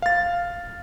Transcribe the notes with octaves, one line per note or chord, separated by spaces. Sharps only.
F5 A6